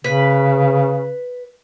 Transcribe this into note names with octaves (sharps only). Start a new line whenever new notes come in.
C#3 B4